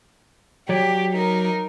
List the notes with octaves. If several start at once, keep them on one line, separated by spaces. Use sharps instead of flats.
F#3 G4 C#5 D5
D#4 A#4